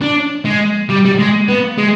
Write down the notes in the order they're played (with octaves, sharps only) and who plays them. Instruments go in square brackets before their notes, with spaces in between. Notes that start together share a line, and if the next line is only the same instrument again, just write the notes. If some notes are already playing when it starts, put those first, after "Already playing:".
[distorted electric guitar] D4
G#3
G3
G3
G#3
B3
G#3